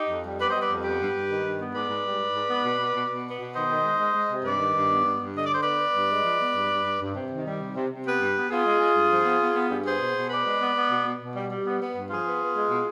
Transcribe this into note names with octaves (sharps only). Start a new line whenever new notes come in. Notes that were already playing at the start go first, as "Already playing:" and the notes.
Already playing: D#4 G4
F2
G3
B3 B4 D5
G3 C5 D#5
B4 D5
F2
B3 G4 B4
G2
G2
D#3
G2
B3
G#2 B4 D5
G#2
G3
G#2
G#2
B3
B2
B2
B2
B2
B3
B2
D#3 C5 D#5
D#3
G#3
G#3
G#3
C3
G2 B4 D5
D#3
G2
B3
G2
G2
D3 D#5
D5
D3 C5
B3 B4 D5
B3
G2
G#3
F3
B3
G2
G2
G2
G2
C3
D#3
G3
C3
C3
C3
B3 G4 B4
G2
B3
B3 F4 G#4
G#3
G#3
G2
F3
B3
B3
B3
G2
B3 G#4 C5
B2
B2
B3 B4 D5
G#3
B3
B3
B2
B2
B2
G3
G3
B3
B3
G2
F3 F4 G#4
B3
B3
G#3
B2